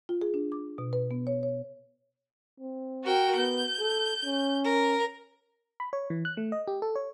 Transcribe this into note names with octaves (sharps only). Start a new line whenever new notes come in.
F4
G#4
D4
D6
B2
B4
B3
C#5
C#5
C4
F#4 A#4 G5
B3 G6
A4
C#4
A#4
B5
C#5
E3
F#6
A3
D#5
G4
A4
C#5